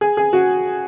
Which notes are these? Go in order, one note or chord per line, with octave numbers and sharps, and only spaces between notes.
G#4
G#4
F#4